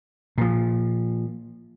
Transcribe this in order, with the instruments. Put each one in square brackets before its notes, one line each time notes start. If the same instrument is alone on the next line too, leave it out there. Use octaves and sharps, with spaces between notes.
[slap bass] A#2 F3